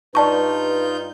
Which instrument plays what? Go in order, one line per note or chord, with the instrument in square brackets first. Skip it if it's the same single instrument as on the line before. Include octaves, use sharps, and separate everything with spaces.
[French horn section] G2 B4 [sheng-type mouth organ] D#4 F4 G6 [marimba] D5 A5 C#6